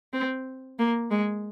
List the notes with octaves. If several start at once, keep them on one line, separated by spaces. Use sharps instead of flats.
C4
A#3
G#3